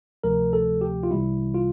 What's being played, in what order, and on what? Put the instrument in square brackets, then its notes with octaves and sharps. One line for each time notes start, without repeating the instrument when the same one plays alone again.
[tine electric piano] D2 C3 F3 A3 A#4
A4
G4
F4
C2 C3 E3 G3 E4
F4